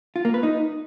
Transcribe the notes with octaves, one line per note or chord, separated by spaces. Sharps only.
F4
A#3
B4
D#4